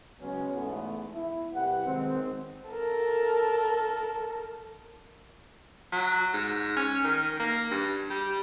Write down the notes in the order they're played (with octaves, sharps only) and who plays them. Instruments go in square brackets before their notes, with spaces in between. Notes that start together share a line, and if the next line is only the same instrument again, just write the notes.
[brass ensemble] C#3 F#3 G#3 B3 C#4
E2 G#2 A3 B3
E4
C2 G4 B4 F#5
D#3 F#3 G#3 C4
[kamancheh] A4 A#4
[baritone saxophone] F#3
G#2
C#4
D#3
A#3
G2
G3